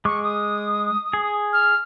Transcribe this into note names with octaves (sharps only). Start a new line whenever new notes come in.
G#3 C#6 D6
D#6
G#4
F6